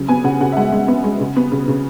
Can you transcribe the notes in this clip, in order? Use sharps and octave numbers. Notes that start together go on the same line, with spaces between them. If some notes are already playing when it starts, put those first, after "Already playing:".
Already playing: C#3 F#3
B3 G#5
C#3 F#5
C#3 F#5
E5
G#3 F#5
G#3
B3
G#3
C#3
B3
C#3
C#3